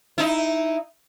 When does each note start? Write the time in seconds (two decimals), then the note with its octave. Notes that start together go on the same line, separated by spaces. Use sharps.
0.18 D#4 E4